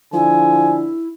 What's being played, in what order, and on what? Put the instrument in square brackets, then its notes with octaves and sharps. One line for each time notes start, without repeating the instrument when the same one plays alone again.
[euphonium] D3 [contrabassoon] F3 [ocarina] E4 [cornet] G#5